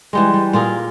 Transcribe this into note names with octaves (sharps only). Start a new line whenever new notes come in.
E3 G3 G#3
G3
A#2 F4 G#4 A#4